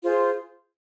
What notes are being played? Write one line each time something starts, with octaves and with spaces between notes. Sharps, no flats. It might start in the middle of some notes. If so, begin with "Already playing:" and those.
F4 G#4 C5